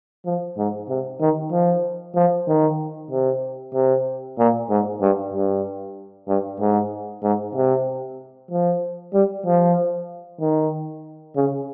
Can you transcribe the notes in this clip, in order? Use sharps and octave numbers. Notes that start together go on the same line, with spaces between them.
F3
G#2
C3
D#3
F3
F3
D#3
C3
C3
A#2
G#2
G2
G2
G2
G#2
G#2
C3
F3
G3
F3
D#3
C#3